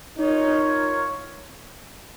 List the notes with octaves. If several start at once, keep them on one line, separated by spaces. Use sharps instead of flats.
D#4 F4 A#4 C#5